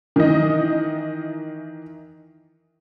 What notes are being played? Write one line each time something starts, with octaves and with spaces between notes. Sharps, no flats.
D#3 E3 D#5